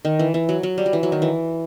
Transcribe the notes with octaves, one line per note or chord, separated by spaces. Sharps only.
D#3
E3
E3
F#3
F#3
G3
F#3
E3
F#3
D#3
E3